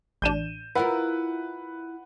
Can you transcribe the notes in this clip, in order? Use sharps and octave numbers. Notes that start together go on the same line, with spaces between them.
A1 D4 G6 D#7 E7
E4 F4 A#4 B4 F#5